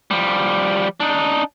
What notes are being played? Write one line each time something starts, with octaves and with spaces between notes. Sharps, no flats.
F3 G3
D4 D#4